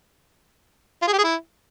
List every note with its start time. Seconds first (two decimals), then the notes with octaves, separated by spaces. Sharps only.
1.02 F4
1.07 G#4
1.13 G4
1.18 G#4
1.24 E4